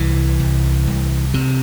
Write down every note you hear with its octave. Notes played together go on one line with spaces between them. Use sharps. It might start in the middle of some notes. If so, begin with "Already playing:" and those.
Already playing: C2 E3
C2
C2
C3